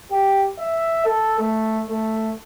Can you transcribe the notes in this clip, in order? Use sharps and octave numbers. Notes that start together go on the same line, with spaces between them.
G4
E5
A4
A3
A3